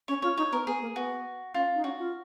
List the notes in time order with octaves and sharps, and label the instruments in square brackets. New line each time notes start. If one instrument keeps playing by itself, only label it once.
[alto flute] C#4 [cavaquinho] C#5
[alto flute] F4 [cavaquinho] C#5
[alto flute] D#4 [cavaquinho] C#5
[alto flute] B3 [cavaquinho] A#4
[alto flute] B3 [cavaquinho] G#4
[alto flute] A#3
[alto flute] B3 [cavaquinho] F#4
[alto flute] C#4 [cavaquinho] F4
[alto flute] D#4
[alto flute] C#4 [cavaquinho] F#4
[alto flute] F4